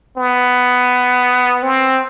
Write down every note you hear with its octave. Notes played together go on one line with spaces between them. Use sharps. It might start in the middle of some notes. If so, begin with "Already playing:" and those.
B3
C4